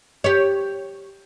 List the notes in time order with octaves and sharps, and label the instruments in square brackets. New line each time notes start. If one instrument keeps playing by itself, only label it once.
[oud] G4 C#5